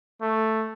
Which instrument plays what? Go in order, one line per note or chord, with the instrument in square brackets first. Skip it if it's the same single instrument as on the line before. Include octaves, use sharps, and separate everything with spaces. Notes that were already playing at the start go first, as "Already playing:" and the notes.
[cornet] A3